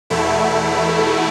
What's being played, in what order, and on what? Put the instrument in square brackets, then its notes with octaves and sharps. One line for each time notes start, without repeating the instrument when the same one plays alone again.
[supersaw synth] E2 B2 A3 E4